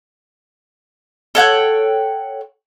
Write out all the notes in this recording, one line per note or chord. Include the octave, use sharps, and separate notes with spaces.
A4 C#5 F#5 G5